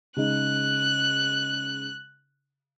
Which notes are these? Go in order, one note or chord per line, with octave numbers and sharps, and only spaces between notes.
C#3 G#3 D#4 F#6